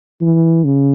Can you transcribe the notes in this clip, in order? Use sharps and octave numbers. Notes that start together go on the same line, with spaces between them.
E3
C#3